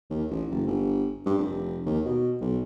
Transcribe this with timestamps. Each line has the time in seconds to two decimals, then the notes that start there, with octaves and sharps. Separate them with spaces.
0.10 D#2
0.30 A1
0.51 F#1
0.67 G1
1.26 G2
1.38 F1
1.86 D#2
2.05 B2
2.41 B1